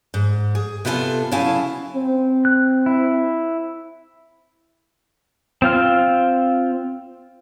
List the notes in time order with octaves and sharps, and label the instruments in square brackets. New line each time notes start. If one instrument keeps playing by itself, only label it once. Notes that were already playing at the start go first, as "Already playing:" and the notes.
[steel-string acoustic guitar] G#2
G#4
C3 B3 E4 F4 A4 G#5
C#3 F#3 E4 F5 G#5 A5
[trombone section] C4
[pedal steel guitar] F#6
E4
C4 F4 F6